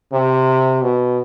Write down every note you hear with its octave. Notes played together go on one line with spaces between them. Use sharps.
C3
B2